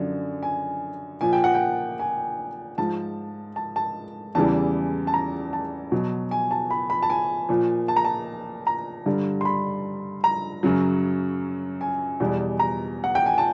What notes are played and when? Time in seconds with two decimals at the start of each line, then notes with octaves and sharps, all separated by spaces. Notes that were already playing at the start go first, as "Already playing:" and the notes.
Already playing: F#2 D3 F3
0.43 G#5
1.21 A#2 F3 G#5
1.33 G5
1.44 F#5
1.55 G5
2.00 G#5
2.78 G#2 F3 A5
3.56 A5
3.76 A5
4.35 E2 C#3 E3 G3 A5
5.07 A5
5.14 A#5
5.53 A5
5.92 B2 F#3
6.31 G#5
6.51 A5
6.71 B5
6.90 B5
7.03 A5
7.10 G#5
7.49 A#2 F3
7.88 A5
7.96 A#5
8.05 A5
8.67 A#5
9.06 G2 D3 G3
9.41 C6
9.45 B5
10.24 A#5
10.63 F#2 C#3 F#3
11.81 G#5
12.20 E2 B2 G3
12.59 A#5
13.04 F#5
13.15 G5
13.26 G#5
13.38 A5